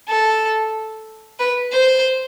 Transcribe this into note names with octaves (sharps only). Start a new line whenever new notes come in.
A4
B4
C5